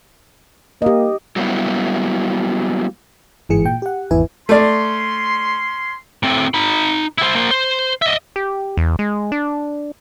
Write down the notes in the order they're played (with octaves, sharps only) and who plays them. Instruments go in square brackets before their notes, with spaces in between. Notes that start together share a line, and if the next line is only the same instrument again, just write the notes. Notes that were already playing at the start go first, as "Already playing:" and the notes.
[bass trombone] A#3 [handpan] G4 D#5
[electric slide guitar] F#3 G3 A#3 B3 E4
[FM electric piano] G1 G#2 E3 G#4 C#7
A#2 G5
G4 F#5
G#1 E2 E4 B4 G#5
[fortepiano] A3 D5 [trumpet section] C#4 C6
[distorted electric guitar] A2 C4
D#4 B5
E4 C5
A#3 C5
C5
D#5 E5
[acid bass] G4
E2
G#3
D4